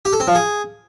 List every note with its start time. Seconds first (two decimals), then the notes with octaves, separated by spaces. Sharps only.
0.05 G4
0.13 A4
0.20 C4
0.27 F3
0.35 G#4